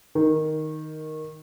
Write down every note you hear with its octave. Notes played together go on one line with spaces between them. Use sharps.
D#3